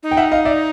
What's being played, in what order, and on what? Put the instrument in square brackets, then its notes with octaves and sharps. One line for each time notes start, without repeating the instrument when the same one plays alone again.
[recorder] D#4
[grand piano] G5
E5 F#5
D#5 F5
D5 E5